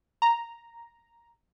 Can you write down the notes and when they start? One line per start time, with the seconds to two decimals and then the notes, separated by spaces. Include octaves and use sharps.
0.22 A#5